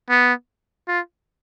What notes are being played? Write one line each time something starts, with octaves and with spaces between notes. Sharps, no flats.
B3
F4